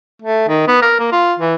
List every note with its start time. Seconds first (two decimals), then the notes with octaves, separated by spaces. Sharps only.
0.22 A3
0.48 D#3
0.68 B3
0.82 A#4
1.00 A#3
1.12 F4
1.39 E3